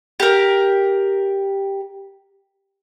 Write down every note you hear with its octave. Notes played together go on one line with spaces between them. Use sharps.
G4 A#4